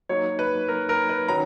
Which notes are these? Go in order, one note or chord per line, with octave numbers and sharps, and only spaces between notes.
F#3 A#3 D#4 C#5
B4
A#4
A#4
B4
D#3 F#3 C#4 A#5